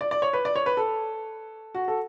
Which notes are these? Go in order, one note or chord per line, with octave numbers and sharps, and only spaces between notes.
D5
D5
C#5
B4
D5
C#5
B4
A4
F#4
A4